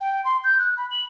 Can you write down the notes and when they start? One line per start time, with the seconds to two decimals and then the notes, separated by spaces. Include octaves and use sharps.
0.01 G5
0.24 C6
0.44 G6
0.59 F#6
0.77 B5
0.91 F#7